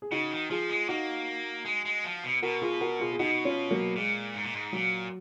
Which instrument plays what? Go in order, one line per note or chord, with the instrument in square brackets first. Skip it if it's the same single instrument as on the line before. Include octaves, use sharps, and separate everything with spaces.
[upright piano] G#4
[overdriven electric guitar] C#3 [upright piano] D#4 F#4
[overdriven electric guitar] D#3
[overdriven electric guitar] F3 [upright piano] F4 G#4
[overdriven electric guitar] G#3
[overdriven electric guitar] A#3 [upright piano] D#4 F#4
[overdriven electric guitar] G#3
G#3
F3
B2
[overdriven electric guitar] B2 [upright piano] F#4 A#4
[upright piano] F4 G#4
F#4 A#4
F4 G#4
G#4
[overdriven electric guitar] B2 [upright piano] D#4 F#4
[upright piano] C#4 F4
F#3 A#3
[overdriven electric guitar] A#2 [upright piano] G#3
[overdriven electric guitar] G#2
A#2
G#2
[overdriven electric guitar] A#2 [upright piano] F#3